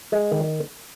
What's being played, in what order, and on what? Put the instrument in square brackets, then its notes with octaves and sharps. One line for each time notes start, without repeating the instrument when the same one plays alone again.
[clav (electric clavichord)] G#3
D#3